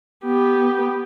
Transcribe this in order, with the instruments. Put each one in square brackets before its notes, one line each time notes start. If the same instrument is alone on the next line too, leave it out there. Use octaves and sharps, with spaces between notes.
[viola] B3 G4